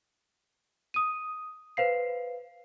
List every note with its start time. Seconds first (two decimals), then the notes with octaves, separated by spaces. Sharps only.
0.94 D#6 D#7
1.77 B4 C5 F5 C7